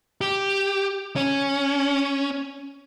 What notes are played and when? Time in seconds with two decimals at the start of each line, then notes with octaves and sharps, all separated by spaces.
0.21 G4
1.16 C#4